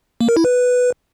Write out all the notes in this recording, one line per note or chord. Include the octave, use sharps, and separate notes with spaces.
A#3
A#4
E4
B4